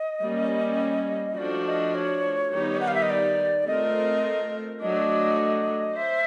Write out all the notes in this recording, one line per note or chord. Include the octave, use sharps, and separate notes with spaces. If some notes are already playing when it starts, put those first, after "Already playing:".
Already playing: D#5
G3 A#3 C#4
F3 A3 D4 F#4 D5
D#5
C#5
D#3 G3 B3 D#4 G4
F#5
F5
E5
D#5
D5
A3 C4 F4 A#4 D#5
F#3 A3 D4 D#5
C5 E5